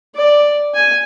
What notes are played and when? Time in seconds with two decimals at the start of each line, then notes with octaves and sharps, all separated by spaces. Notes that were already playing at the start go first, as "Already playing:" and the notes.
0.14 D5
0.75 G#5